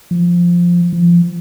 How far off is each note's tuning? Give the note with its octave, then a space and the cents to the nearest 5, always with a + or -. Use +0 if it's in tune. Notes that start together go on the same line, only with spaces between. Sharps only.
F3 +0
F3 -20